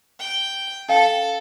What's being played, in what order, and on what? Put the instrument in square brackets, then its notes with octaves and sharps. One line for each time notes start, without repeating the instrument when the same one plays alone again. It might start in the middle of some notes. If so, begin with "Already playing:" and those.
[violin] G5
[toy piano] C#4 F5 G5 [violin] A4